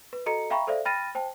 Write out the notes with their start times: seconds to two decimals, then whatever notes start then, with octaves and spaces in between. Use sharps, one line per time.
0.13 B4
0.26 F#4 A4 D#5 A#5 C#7
0.50 E5 F5 G5 A#5 B5 C#6
0.67 A4 C5 D5 E5 F5
0.85 G5 B5 F6 A6 A#6 D#7
1.15 C5 G5 A5